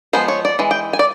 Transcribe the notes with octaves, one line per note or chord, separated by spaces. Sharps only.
F3 G#3 B3 C5
C#5
D5
E3 G#3
G5
G#5
D5